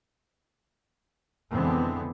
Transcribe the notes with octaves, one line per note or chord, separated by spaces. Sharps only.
F1 D3 E3 G#3 B3 C4